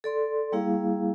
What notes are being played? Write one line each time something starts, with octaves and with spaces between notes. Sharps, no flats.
A4 D5 C6
G3 A#3 E4 G#4 F5